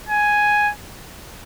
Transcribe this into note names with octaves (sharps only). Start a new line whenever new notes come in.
G#5